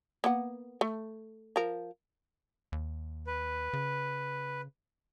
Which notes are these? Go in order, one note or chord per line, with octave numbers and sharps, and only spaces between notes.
A#3 B3 F#5
A3
F3 A#4
D#2
B4
C#3